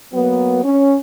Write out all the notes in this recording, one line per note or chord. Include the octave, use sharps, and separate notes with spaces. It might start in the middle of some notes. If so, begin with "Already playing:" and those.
F#3 A#3 B3
C#4